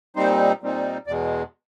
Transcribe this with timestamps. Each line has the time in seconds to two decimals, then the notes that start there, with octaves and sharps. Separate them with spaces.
0.16 A#2 G3 C4 D#4 C5
0.61 A#2 G3 C4 D#4
1.07 E2 B2 G#3 D5